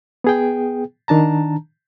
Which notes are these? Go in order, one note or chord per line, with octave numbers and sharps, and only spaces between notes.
B3 G#4 G5
D#3 D4 A5 A#5